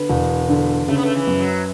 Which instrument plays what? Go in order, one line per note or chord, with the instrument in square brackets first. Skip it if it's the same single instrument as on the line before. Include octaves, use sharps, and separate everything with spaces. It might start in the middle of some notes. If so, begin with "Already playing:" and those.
Already playing: [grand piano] D3 [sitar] B3
[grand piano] E1
D3
[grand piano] C#3 [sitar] A3
[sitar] B3
A3
E3
[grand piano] F#2
[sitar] F#3